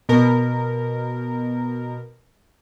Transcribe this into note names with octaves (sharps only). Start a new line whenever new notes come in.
B2 A#4